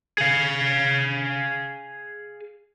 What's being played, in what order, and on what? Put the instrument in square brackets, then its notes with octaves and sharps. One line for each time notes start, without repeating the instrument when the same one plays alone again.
[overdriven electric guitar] G#4 F5